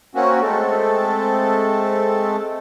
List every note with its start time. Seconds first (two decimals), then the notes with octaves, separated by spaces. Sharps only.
0.15 A#3 C4 C#4 F#4
0.42 G#3 A3 C4 A4